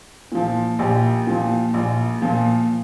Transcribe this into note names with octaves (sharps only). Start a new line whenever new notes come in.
A#2 F3
A#1 G4
A#2 F3
A#1
A#2 F3